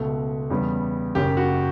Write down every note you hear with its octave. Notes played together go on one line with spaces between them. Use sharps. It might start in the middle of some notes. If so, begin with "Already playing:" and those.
Already playing: C#2 B2 A3
E2 C#3 G3 B3
F#1 F#2 C#3 G4
F#4